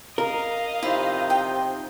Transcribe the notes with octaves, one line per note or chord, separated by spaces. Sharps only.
A#4 D#5 F5
C3 F3 D#4 E4
G5